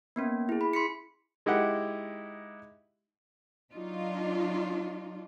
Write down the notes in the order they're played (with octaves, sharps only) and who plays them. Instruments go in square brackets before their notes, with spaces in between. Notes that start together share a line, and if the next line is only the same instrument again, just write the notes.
[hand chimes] A#3 B3 C#4
E4 G#4
B5
C6 B6 C#7
[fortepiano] G#3 D#4 E4 G4 F#5
[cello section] F#3 D4 D#4 F4